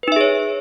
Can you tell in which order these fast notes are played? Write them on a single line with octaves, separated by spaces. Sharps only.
B4 D#4 E5 G#4 C#5